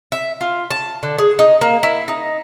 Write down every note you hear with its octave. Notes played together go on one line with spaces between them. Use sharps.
E5
F4
A5
D3
G#4
D#4
A#3
E4
D#4